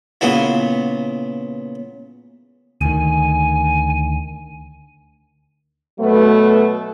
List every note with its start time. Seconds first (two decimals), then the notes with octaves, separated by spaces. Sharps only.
0.21 A#2 C#3 B3 E4
2.81 D2 D#3 G#5
5.99 B2 F#3 A3 B3 B4